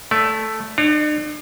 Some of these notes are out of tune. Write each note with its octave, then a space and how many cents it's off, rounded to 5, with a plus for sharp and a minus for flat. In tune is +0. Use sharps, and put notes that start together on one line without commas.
A3 +0 D5 -35
D4 +45 C#5 +5